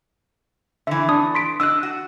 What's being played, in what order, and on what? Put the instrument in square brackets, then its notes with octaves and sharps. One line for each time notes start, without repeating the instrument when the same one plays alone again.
[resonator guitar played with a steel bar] D3 E3 [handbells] E5
[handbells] D4 D#6
C6 B6 D7
[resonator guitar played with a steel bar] D4 D#5 [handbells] E6 F#6
[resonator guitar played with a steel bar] F#4